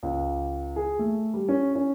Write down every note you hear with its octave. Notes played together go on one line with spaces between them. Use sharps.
C#2
G#4
A3
G3
C#4
C#4